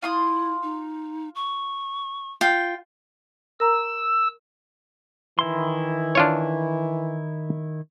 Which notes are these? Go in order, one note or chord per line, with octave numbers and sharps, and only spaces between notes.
E4 F4 C6 D#6
D#4
C#6
F4 G5
A#4 A#5 E6
D#3 E3 E4 C6
D4 F4 C#5